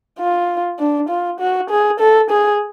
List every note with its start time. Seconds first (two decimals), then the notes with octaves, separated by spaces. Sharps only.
0.19 F4
0.79 D4
1.09 F4
1.40 F#4
1.70 G#4
2.00 A4
2.30 G#4